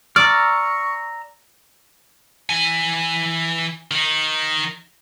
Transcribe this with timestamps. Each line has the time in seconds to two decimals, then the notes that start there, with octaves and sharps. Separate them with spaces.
0.16 D5 A#5 C#6 E6 F6
2.50 E3 G#5
3.91 D#3 D#4